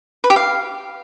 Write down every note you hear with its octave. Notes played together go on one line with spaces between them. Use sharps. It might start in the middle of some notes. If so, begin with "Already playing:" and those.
B4
G4
F5